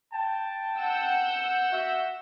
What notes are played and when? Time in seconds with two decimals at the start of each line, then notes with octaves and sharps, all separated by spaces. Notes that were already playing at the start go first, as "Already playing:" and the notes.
0.14 G5 A5
0.79 F#5 E6 G6
1.72 F#4 E5